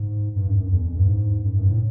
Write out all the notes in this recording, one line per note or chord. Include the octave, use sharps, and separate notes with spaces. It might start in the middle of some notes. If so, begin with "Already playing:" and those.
Already playing: G#2
G2
F#2
F#2
E2
F2
G2
G#2
F#2
G2
A2